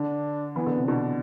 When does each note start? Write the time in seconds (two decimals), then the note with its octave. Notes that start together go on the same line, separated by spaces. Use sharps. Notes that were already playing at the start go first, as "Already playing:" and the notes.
Already playing: D3 D4
0.56 E3 B3
0.66 D3
0.77 C3
0.88 B2 D4